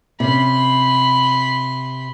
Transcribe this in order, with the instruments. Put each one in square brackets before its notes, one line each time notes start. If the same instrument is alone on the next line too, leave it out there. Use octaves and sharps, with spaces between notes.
[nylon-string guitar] C3 C#4 [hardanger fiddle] B5 C6